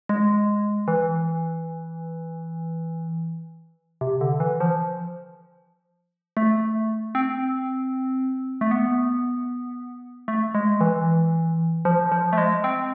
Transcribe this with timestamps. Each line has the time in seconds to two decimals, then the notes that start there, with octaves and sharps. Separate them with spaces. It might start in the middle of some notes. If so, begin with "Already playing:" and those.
0.09 G#3
0.88 E3
4.01 C3
4.21 D3
4.40 E3
4.60 F3
6.37 A3
7.15 C4
8.61 A3
8.71 B3
10.28 A3
10.55 G#3
10.81 E3
11.85 F3
12.12 F3
12.33 A3
12.38 G#3
12.64 C4